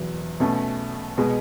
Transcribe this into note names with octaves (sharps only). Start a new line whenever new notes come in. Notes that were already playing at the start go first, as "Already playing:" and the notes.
Already playing: E2 B2 F#3 B3
B2 A3 C#4
B2 G#3